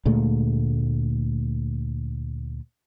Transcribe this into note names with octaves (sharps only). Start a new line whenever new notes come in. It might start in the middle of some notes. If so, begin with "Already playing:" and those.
D2 A#2 G#3 A3